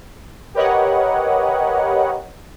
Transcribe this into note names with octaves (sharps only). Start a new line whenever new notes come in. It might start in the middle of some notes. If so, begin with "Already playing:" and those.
G4 A#4 B4 C#5 D#5 F#5